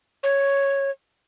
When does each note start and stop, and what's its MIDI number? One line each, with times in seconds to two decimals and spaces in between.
0.23 0.91 73